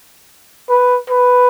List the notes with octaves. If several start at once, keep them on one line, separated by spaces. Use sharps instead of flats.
B4
B4